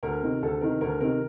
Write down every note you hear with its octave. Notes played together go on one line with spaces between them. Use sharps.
D2 A#4
C3 D#3
D2 A4
C3 D#3 A#4
D2 A#4
C3 D#3 A#4